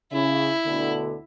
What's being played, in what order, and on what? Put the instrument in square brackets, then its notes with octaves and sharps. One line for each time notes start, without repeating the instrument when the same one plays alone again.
[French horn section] C#3 [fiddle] E4
[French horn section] D2 B2 D3